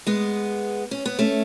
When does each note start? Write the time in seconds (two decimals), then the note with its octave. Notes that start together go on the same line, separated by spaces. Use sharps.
0.06 G#3 B3
0.91 C#4
1.06 B3
1.19 A3 C#4